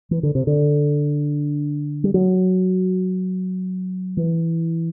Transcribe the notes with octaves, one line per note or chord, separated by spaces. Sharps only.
E3
D3
C3
D3
G3
F#3
E3